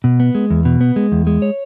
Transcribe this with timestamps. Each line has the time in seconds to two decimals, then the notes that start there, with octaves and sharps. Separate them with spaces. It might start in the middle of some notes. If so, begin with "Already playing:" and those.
0.04 B2
0.20 B3
0.35 G#3
0.50 E2
0.65 B2
0.81 B3
0.96 G#3
1.12 E2
1.27 G#3
1.42 C#5